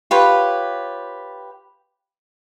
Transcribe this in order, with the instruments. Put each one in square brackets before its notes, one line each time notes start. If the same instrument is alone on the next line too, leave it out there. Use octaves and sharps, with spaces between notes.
[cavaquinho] F4 G4 B4 C#5